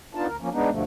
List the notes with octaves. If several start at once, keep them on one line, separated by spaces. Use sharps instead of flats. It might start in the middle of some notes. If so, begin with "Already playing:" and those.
B3 D4 D#4 F4 A5
D2 A#4
F3 A#3 C#4
G#3 B3 D4 D#4
D2 G2 B2 D3 F3 A3